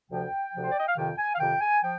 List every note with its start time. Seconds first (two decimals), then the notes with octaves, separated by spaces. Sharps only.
0.11 D2 C3 F3 G5
0.54 D2 C3 F3
0.63 C5
0.72 D5
0.79 D#5
0.88 F5
0.96 F2 C3 D#3 G5
1.18 G#5
1.35 F5
1.39 F2 C3 D#3 G5
1.61 G#5
1.82 F3 G5